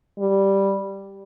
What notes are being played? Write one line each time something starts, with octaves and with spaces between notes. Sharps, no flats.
G3